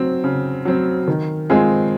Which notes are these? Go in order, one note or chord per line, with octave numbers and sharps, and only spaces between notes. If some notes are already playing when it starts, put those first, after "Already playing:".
Already playing: F#3 C4
C#3
F#3 C4
D#3
G#3 C4 F4 G#4